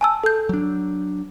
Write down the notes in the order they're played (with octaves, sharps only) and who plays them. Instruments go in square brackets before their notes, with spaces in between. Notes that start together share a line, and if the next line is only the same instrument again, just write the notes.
[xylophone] G#5 A5 E6
A4 G6
[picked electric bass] F#3 D4